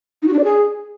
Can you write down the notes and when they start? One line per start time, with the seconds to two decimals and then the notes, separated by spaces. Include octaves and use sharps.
0.22 D#4
0.28 F#4
0.33 D4
0.39 D5
0.44 G#4